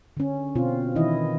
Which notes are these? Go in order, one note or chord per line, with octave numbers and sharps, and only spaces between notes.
D3 C#4
B2 C4 F4
D#3 E3 E4 D#5